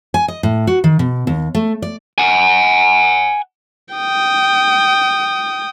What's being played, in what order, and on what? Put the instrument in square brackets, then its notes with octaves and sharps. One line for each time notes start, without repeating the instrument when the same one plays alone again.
[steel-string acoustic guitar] G#5
D#5
A2
F#4
D#3
B2
D#2
A3
D5
[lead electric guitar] F#5 G#5
[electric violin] G5 D#6